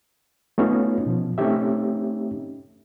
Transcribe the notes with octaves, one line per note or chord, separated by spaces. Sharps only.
A3 B3 C#4 D#4 F4 F#4
B2 F3
A3 C4 C#4 D#4 G4 E5